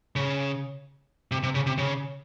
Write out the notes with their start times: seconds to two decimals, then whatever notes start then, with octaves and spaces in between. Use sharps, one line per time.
0.16 C#3
1.32 C3
1.43 C3
1.55 C#3
1.66 C3
1.78 C#3